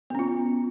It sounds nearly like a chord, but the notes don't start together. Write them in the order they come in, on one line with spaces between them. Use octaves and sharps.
B3 C#4 F4